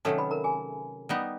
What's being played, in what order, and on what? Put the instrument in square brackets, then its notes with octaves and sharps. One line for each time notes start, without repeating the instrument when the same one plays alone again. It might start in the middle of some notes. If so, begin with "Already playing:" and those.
[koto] C3 D#3 F#3 A3 C#4 [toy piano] A4 A5
[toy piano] B4 B5
A#4 A#5
G#4 G#5
[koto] G3 B3 D#4